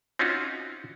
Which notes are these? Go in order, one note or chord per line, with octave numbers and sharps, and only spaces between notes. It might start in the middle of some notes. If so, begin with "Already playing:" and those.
C4 C#4 D#4 F4 F#4